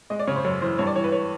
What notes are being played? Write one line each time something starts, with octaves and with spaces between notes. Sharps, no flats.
G#3 D#5
D5
C#3 C#5
C5
F#2 C#5
E3 C5
G2 C#5
D5
E3 C#5
B4
C#5